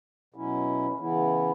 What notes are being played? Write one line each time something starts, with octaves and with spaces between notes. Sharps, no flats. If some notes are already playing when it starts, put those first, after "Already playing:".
B2 F#3 C#4 E4
C#3 E3 B3 E4